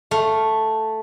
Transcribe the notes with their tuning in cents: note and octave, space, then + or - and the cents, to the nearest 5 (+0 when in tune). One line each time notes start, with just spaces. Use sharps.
A3 +0 F5 +0 C6 +35